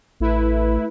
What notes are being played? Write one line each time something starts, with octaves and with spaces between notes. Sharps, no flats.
A1 A3 E4 B4